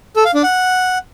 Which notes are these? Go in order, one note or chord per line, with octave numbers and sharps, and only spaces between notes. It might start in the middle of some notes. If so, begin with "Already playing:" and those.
A4
F5
D4
F#5